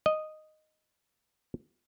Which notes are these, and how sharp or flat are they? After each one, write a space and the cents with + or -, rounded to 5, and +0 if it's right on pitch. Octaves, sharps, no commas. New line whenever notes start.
D#5 -5